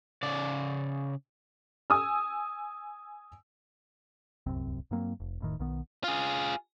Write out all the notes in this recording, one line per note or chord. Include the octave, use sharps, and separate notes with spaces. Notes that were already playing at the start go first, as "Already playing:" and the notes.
C#3 D5
G#5 D#6 E6
D1 C2 F#2 C4
G2 F#3 A#3 C4
F1
F1 A2 D#3
B1 D#3 B3
F4 G#4